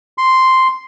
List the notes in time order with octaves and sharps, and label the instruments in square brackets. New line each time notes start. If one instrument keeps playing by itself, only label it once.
[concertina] C6